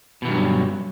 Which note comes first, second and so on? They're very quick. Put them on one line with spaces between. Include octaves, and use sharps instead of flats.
B2 E3 G2 D#3 F#3